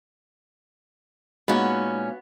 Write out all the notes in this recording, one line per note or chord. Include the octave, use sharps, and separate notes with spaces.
A#2 G#3 B3 C#4 D#4 F#4 B5